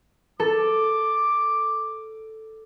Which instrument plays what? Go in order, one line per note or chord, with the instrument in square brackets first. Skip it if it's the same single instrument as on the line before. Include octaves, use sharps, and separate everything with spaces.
[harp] A4 [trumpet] D6